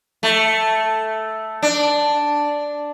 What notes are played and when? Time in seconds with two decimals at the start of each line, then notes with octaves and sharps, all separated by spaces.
0.23 A3
1.62 D4